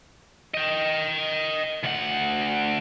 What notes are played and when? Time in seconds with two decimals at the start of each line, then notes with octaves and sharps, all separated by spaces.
0.54 D#5 G5
1.83 D2 F#5